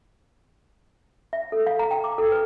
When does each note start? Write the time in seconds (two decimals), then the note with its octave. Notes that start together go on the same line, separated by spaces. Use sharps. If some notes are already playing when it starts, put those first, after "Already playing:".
1.33 E5
1.52 A4
1.67 F5
1.79 A#5
1.91 G5
2.04 D6
2.18 A4
2.32 B4